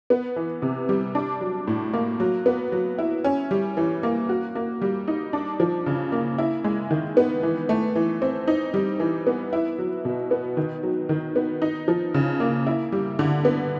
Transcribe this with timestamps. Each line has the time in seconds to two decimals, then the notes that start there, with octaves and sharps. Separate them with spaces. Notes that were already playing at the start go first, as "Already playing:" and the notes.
0.10 B3
0.36 E3
0.62 C3
0.89 G3
1.15 D4
1.41 F#3
1.67 A2
1.93 A#3
2.20 F#3
2.46 B3
2.72 F#3
2.98 E4
3.24 C#4
3.51 G3
3.77 E3
4.03 A#3
4.29 F#4
4.55 A#3
4.82 G3
5.08 D#4
5.33 D4
5.60 F3
5.86 C#3
6.12 A#3
6.38 E4
6.64 G#3
6.91 D#3
7.17 B3
7.43 E3
7.69 A3
7.95 E3
8.22 C4
8.48 D#4
8.74 G3
9.00 E3
9.27 B3
9.53 E4
9.79 F#3
10.05 B2
10.31 B3
10.57 D#3
10.83 F#3
11.09 D#3
11.36 B3
11.62 D#4
11.88 F3
12.14 C#3
12.40 A#3
12.67 E4
12.92 G3
13.19 D3
13.45 B3